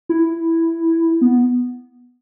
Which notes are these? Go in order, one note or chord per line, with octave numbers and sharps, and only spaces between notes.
E4
B3